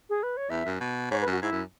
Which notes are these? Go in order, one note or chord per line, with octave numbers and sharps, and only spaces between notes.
G#4
B4
C#5
E2 E5
F#2
B2
G#2 C#5
B4
F#2
F#4
G#2 E4
F#2